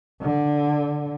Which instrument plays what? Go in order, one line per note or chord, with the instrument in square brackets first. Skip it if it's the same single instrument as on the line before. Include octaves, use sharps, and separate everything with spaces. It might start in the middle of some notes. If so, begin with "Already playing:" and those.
[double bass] D3